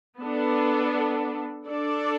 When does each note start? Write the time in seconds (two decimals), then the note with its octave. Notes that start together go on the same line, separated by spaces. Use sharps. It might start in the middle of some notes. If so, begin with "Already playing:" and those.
0.19 B3 D4 A4
1.68 D4 A4 D5